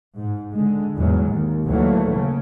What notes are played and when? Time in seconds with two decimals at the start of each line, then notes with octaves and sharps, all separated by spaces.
0.16 G#2
0.53 D3 G#3
0.96 E2 G#2 F#3 G#3
1.30 D#2
1.65 D2 E3 F#3 A3 A#3
2.10 C#3